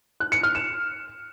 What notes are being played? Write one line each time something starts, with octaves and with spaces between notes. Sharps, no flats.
F#6
C#7
F6
E7